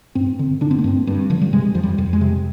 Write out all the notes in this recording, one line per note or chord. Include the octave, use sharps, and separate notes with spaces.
G2 C4
D3
D3 D4
C4
A#3
G2 C4
G2
D3 F3
G3
C3 G#3
F2 F3
G3
F2
G#3
C3